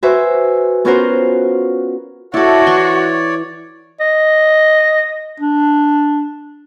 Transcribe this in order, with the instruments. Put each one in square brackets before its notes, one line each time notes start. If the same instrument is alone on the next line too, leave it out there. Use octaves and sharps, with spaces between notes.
[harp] F#4 B4 C5 E5 G#5
B3 C#4 F4 F#4 A#4 C5
[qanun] E4 A4 [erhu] F#4 [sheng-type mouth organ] C#5 D5
[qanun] E3 C6 C#6
[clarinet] D#5
D4